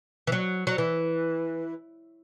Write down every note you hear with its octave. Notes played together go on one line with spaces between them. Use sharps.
E3
F#3
F#3
E3